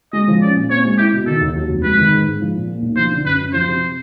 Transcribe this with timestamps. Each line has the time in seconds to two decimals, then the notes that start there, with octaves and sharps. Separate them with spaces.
0.13 G#3 D#5
0.28 F3
0.42 C#4 D5
0.56 A#2
0.70 C4 C#5
0.85 G#3
0.98 E4 G4
1.13 B2
1.26 D#3 A4
1.41 D#2
1.56 F#3
1.69 F1
1.83 G#3 B4
1.98 D#3
2.12 G#2
2.26 G#2
2.41 F3
2.55 A#2
2.68 A#3
2.82 B1
2.96 F3 C5
3.11 D3
3.25 F#2 B4
3.40 F#2
3.53 F3 C5
3.68 C3